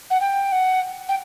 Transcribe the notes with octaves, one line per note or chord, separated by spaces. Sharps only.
F#5
G5
F#5
G5